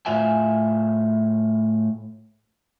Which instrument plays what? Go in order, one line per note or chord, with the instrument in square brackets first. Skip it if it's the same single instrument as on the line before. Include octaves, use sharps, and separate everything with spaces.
[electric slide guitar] A2 F4 E5 G#5